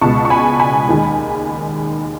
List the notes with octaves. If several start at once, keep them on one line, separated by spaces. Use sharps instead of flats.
C#2 B2 G#3 A5 C#6
C#6
G#5 B5
G#5 B5
D#2 D#3 G#3